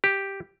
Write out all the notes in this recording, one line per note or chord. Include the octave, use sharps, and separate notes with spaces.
G4